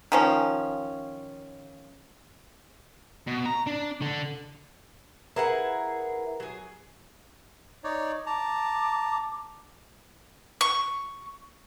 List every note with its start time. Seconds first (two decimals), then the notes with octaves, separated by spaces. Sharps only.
0.12 D#3 F3 C#4
3.27 B2
3.46 A#5
3.67 D4
4.02 D3
5.36 E4 G#4 A#4 B4 F#5 A#5
6.40 F#3 G#4
7.84 D#4 C#5 D5
8.26 A5 A#5 D6
10.61 C#6